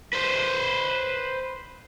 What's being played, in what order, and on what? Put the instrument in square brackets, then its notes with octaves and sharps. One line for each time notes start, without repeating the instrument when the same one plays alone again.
[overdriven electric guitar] B4 C5